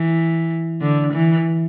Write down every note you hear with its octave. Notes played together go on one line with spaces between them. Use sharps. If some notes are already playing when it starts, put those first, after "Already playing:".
Already playing: E3
D3
E3